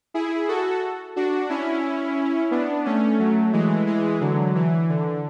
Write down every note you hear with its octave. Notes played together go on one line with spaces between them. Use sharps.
E4 G#4
F#4 A4
D4 F#4
C#4 E4
B3 D4
A3 C#4
F#3 A3
E3 G#3
E3 G#3
D3 F#3
E3
D3